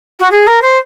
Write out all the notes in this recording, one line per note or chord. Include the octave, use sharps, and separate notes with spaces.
F#4
G#4
A#4
C5